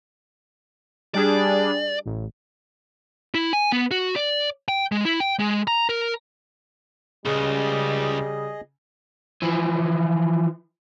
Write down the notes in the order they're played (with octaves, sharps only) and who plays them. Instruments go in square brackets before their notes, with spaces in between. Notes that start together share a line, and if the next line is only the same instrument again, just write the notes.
[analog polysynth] G3 D4 G#4 [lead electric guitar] D5
[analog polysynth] A1
[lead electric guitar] E4
G#5
B3
F#4
D5
G5
G#3
E4
G5
G#3
A#5
A#4
[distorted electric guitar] C#2 [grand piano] C#3 [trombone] G3 [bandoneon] G#4 D#5
[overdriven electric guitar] E3 F3